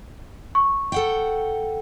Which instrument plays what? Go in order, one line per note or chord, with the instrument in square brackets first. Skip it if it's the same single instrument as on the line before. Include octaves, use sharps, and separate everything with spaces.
[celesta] C#6
[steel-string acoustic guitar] A4 F#5 G5